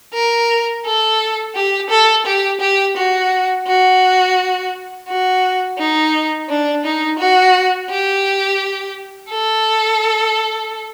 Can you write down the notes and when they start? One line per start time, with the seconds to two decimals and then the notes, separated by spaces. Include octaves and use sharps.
0.14 A#4
0.85 A4
1.55 G4
1.90 A4
2.26 G4
2.60 G4
2.97 F#4
3.67 F#4
5.08 F#4
5.78 D#4
6.49 D4
6.84 D#4
7.19 F#4
7.90 G4
9.31 A4